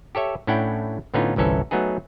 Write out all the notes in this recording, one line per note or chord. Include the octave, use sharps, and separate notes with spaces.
G4 A4 C#5 E5
A2 C#4 D4 E4 F#5 G5
A2 D3 B3 C#4 D#4 F4
G1 C2 E3 C#4 A4
F#3 A3 B3 D#4 G#4